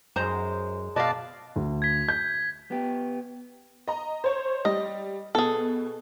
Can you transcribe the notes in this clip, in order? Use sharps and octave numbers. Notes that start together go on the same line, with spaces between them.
F#2 G#3 D#4 C5 A#5
B2 B4 D5 D#5 F5 A5
D2
G#6 B6
G6
B3 G4
D#5 A#5
C5 C#5
G3 D#5
B2 G#4 A4